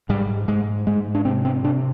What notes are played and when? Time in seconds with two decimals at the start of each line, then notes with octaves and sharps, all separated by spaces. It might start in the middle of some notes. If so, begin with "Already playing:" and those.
0.09 G#2 G3
0.48 G#2 G#3
0.87 G#2 G#3
1.15 D4
1.25 C3 C4
1.45 C4
1.64 C3 D4